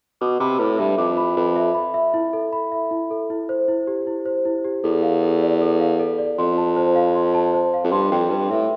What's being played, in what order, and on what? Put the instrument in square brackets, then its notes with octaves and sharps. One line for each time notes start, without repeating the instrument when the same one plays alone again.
[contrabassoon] B2 [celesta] D6
[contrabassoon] C3 [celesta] B5
[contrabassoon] A2 [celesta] B4
[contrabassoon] G2 [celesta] E5
[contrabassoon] F2 [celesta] D6
[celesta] B5
[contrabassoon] F2 [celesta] B4
[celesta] E5
B5
E5
E4
A4
B5
E5
E4
A4
E4
C5
E4
G4
E4
C5
E4
G4
[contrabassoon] E2 [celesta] A4
[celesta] F5
A4
D5
A4
F5
A4
D5
[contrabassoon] F2 [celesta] C6
[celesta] A5
C5
F5
C6
A5
C5
F5
[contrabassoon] F2
[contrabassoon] G2 [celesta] C6
[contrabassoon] F2 [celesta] G5
[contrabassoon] G2 [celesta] B4
[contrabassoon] A2 [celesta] E5